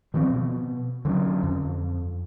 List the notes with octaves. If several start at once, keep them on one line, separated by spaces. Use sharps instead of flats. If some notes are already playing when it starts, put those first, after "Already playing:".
D#3 F3 F#3 C4
B2
D3 F#3 C4 C#4
F2